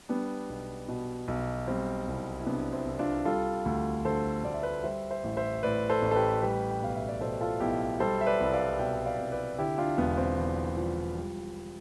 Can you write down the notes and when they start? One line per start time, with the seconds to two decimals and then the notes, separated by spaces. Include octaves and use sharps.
0.09 G3 B3 D4
0.49 B1
0.88 B2
1.28 B1
1.68 G3 C4
2.08 C2
2.39 E4
2.46 C3 B3 D4
2.72 C4 E4
2.86 C2
2.99 D4 F4
3.25 G3 F4 A4
3.65 D2
4.05 D3 A4 C5
4.44 D2 D5
4.54 E5
4.63 B4 D5
4.84 G3 C5 E5
5.11 C5 E5
5.24 A1
5.37 C5 E5
5.63 A2 B4 D5
5.90 A4 C5
6.02 A1
6.11 A4
6.15 G4 B4
6.42 G3 G4 B4
6.71 G5
6.81 B1 F5
6.95 E5
7.09 D5
7.21 B2 A4 C5
7.41 F4 A4
7.60 B1 E4 G4
8.00 G3 A4 C5
8.21 E5
8.27 B4 D5
8.40 C2
8.53 D5 F5
8.79 B2 E5 G5
9.06 D5 F5
9.19 C2
9.32 B4 D5
9.58 D3 E4 G4
9.78 D4 F4
9.98 E1 B3
10.17 C4
10.38 E2
10.77 F3
11.16 G3